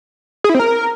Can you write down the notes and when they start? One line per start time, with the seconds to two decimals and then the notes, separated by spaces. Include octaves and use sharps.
0.44 G#4
0.49 E4
0.55 C4
0.60 A#4